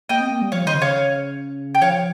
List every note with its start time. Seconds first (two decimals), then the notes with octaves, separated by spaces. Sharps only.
0.09 A#3 D#5 G5
0.21 C4
0.31 A#3
0.42 G3
0.52 F3 C#5 F5
0.66 D#3 C5 D#5
0.74 C#3
0.82 C#5 F5
1.75 G5
1.82 F3 C#5 F5